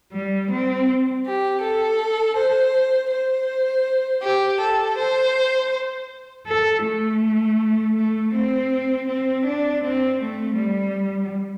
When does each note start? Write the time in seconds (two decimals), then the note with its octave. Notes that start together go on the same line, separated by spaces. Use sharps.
0.12 G3
0.49 C4
1.24 G4
1.61 A4
2.36 C5
3.11 C5
4.23 G4
4.60 A4
4.98 C5
6.46 A4
6.84 A3
7.96 A3
8.33 C4
9.08 C4
9.45 D4
9.83 C4
10.20 A3
10.56 G3